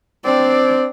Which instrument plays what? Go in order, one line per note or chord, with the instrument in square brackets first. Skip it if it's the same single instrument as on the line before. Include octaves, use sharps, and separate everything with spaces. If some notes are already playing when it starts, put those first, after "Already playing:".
[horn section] C4 [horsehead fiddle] D4 D5